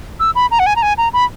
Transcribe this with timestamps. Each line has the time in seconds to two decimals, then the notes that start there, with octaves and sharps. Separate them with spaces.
0.20 E6
0.35 B5
0.51 A#5
0.59 F#5
0.66 G#5
0.76 A#5
0.82 G#5
0.98 A#5
1.13 B5